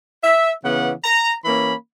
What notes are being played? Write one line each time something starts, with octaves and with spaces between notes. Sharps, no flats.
E5
C#3 E3 B3 F#5
A#5
E3 A#3 C#4 B5